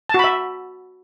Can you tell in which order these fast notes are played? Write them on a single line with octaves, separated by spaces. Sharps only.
A5 F#4 B5 E5